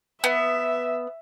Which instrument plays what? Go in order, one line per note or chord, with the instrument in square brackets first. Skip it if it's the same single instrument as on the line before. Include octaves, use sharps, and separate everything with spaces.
[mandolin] B3 [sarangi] E5